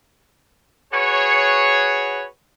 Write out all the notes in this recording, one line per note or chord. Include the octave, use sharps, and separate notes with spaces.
F#4 G#4 B4 C#5